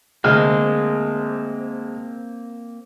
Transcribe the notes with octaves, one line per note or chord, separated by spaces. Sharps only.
D2 G#3 A#3 C4 F6